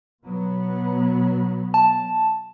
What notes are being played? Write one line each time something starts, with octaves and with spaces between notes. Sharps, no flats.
B2 F#3 B3
A5